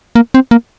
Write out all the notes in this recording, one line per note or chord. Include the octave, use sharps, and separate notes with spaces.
A#3
C4
A#3